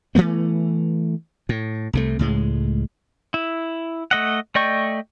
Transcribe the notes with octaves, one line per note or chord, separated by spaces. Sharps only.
E3 F3 A3 B3
A2
C2 C3 A3
C#2 A2 G#3
E4
A3 D#5 F#5
A3 D5 D#5 G5 C#6